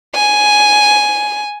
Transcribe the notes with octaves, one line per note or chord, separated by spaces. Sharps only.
G#5